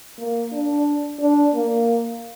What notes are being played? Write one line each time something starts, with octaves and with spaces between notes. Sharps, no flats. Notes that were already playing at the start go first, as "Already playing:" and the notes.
A#3
D4
D4
A#3